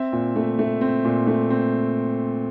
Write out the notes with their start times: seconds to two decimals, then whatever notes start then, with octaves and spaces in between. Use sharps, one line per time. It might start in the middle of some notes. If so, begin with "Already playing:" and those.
Already playing: C4 E5
0.13 A#2
0.36 A3
0.59 A3
0.81 C4
1.05 A#2
1.27 A3
1.50 C4